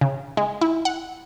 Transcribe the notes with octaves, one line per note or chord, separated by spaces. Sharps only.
C#3
G#3
E4
F#5